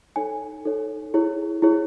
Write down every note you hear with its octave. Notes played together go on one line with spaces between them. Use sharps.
D#4 A4 C#5 G#5
D#4 A4 C#5
E4 G#4 C#5
E4 G#4 C#5